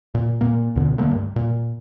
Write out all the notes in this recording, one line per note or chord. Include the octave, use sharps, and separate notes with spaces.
A#2
A#2 A#3
C#2 B2 D3
D3 G3 A3 A#3
G2
A#2